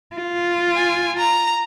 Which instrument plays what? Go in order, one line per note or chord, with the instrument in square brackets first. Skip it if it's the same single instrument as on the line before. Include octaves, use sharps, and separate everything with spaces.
[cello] F4
[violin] G#5
A#5